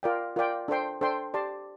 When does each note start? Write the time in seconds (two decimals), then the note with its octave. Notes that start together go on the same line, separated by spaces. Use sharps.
0.03 F4 A#4 D5 G5
0.36 F4 A#4 D5 G5
0.68 D4 A4 C5 G5 C6
1.01 D4 A4 C5 G5 C6
1.34 G4 D5 A5 C6